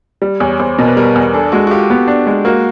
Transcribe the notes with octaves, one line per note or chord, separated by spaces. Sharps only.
G3
E2 C#5
E2 C5
B2 A#4
B4
G3 A#4
E2
D4 A4
G#3 F#4
F#4
F4 G4
B3
D4
G#3
A#3 F#4